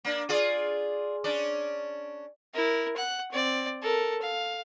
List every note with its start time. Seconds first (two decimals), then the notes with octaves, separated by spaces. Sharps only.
0.05 A#3 D4
0.29 F4 G#4 D5
1.24 C#4 D4 D5
2.54 E4 A#4
2.96 F#5 F#6
3.32 C4 D5
3.83 A4 A#4
4.22 F5